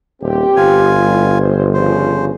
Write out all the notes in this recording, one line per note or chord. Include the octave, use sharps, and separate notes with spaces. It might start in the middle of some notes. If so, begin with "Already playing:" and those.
D#1 C4 G4
G1 F4 G#5
A2 G3
C5
C#3 F3 C5